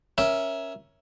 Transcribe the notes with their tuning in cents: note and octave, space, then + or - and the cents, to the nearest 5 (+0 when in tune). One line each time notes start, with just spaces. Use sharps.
C#4 +0 A#4 +20 E5 +0